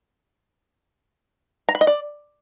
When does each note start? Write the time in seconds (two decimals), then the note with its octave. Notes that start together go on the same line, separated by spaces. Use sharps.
1.69 A#5
1.75 B5
1.81 D#5
1.87 D5